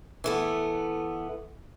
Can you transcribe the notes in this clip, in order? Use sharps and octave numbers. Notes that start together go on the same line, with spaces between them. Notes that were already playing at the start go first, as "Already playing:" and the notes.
E3 A3 B3